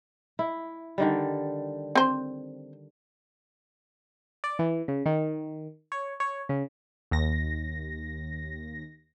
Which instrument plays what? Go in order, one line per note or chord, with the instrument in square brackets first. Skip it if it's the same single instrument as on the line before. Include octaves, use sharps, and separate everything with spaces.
[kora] E4
D3 D#3 G3
[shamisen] C4 C5
[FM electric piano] D5
E3
C#3
D#3
C#5
C#5
C#3
[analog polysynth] D#2 A#6